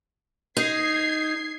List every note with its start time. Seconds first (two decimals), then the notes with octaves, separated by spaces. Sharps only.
0.57 D#4 G#6 C7